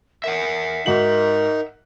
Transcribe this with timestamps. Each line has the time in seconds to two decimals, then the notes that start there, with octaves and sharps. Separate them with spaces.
0.24 A#4 E5 F#5
0.86 G#2 D#4 F#4 A#4 F#7